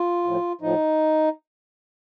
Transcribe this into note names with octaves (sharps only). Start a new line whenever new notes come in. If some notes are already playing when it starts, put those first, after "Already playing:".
Already playing: F4
A2 F3
A2 F3 D#4